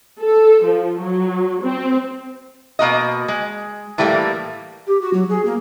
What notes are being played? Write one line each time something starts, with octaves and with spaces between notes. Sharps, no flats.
A4
F3
F#3
C4
B2 A#3 F#4 D#5
G#3
A2 E3 G3 A3 A#3
G4
F#4
F#3
G#4
A#3